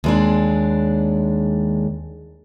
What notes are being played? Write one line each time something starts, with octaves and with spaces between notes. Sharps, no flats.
D#2 G#3 D4